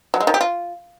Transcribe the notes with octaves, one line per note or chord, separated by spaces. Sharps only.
F#3
G#3
D#3
G4
F4